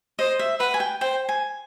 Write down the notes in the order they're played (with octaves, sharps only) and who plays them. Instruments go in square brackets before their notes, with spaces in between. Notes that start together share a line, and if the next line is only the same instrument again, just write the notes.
[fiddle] C5 [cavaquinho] D#5
[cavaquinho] E5
[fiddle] B4 [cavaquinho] F#5
[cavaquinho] G#5
G5
[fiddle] C5 [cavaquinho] G5
[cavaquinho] G#5